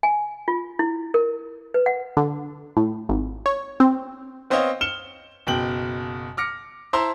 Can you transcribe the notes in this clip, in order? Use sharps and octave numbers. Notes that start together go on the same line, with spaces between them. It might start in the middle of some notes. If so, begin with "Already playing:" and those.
G#5
F4
E4
A#4
B4
F#5
D3
A2
G#1
C#5
C4
B3 C4 C5 C#5 D#5 F5
F6 C#7 E7 G7
F#1 B2 G5 F#7
D6 F6 A#6 C#7
E4 C5 A5 A#5 C6